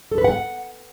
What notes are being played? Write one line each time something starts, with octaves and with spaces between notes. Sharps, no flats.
A4
B4
F#5